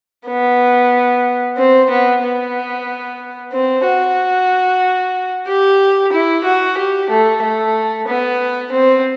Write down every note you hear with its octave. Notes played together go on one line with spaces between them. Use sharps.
B3
C4
B3
B3
C4
F#4
G4
E4
F#4
G4
A3
A3
B3
C4